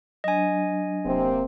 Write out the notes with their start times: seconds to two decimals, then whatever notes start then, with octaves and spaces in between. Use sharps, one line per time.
0.24 F#3 D4 D#5 G#5
1.05 D#1 C3 A#3 C4